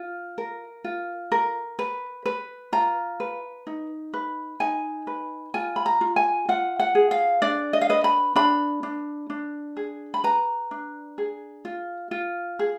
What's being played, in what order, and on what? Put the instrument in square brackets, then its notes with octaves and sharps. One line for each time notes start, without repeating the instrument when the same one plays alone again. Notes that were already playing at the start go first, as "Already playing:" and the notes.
Already playing: [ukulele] F4
A#4
F4
A#4
B4
B4
F4 A#5
B4
D#4
B4
D#4 G#5
B4
F4 G#5
B5
A#5
F4
G#5
F4 F#5
F#5
G#4
F5
D4 D5
D#5
F5
B4 D#5
B5
D4 B5
D4
D4
G#4
B5
B4 A#5
D4
G#4
F4
F4
G#4